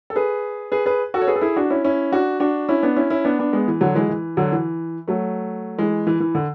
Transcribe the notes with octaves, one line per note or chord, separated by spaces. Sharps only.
A4
G#4 B4
G#4 B4
G#4 B4
F#4 A4
C#5
G#4 B4
A4
E4 G#4
D4 F#4
C#4 E4
C#4 E4
D4 F#4
D4 F#4
C#4 E4
B3 D4
C#4 E4
C#4 E4
B3 D4
B3 D4
G#3 B3
E3
D3 F#3
E3 G#3
E3
D3 F#3
E3
F#3 A3
E3 G#3
E3
E3
D3